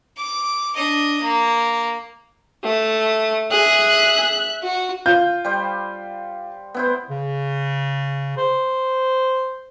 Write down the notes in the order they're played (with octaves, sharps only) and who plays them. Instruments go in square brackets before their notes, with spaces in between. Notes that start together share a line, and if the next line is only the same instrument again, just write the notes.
[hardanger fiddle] D6
D4 D#5
A#3
[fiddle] A3
[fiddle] G#4 [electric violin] E5 F#6
[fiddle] F#4
[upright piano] F4 G6
[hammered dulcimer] G3 C5
B3 E4 C5
[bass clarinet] C#3
C5